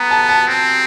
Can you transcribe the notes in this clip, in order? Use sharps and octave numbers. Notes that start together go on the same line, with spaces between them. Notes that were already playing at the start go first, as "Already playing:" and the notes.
Already playing: B3 A#5
A5
A5
C4